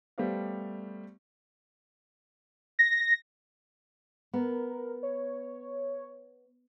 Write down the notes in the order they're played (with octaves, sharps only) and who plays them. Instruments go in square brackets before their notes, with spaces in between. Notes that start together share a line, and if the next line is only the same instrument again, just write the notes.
[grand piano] G3 A3 B3 G4 C5 F5
[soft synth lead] A#6
[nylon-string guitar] B3 [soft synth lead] A#4
[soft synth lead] C#5